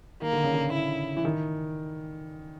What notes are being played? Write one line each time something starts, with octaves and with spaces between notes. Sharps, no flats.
D#3 A#3
D3
C#3
D3
E4
E3
D#3